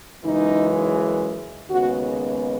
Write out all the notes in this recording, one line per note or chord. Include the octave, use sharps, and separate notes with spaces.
F#2 C#3 E3 G#3 D#4
D#2 C#3 G#3 B3 F#4